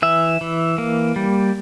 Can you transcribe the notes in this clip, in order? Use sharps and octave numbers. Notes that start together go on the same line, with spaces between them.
E3 E5
E3
A#3
G3